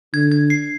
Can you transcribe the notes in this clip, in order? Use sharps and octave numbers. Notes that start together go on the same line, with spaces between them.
D3 G#6
G#6
C7